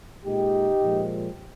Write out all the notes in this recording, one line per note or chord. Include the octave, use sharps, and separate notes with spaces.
A#2 G#3 D#4 G4
A#2 F3 G#3